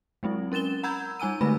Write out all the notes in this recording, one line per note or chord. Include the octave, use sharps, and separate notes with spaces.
F#3 G#3 C4 E4
C#4 A#4 A6 E7 G7
F#5 A#5 B5 E6 G6 G#6
G3 D#4 G#5 E6 D#7
D3 G#3 A3 C4 B4 B5